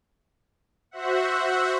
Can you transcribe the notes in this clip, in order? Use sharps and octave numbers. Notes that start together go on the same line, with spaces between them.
F#4 C5 E5 F#5